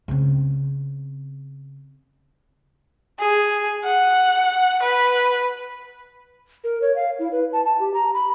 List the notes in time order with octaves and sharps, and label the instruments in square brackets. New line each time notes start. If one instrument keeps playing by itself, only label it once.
[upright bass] C#3 C4
[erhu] G#4
F#5
B4
[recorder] A#4
C#5
F5
E4
B4
A5
A5
G4
A#5
B5